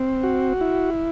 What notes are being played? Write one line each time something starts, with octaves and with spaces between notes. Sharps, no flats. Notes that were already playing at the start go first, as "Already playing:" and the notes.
Already playing: C4
F#4
E4